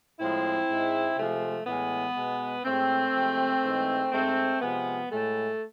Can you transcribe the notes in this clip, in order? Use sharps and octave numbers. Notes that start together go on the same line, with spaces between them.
A2 F3 G#3 C4 E4
G#2 G#3
C3 F3 G#3 A3
A2 E3 G#3 B3
B2 G#3
A2 G#3 A3 C4
C3 F3 G#3
G#2 E3 G#3
G#2 G#3 A3 C4
C3 F3 G#3 B3
A2 G#3 A3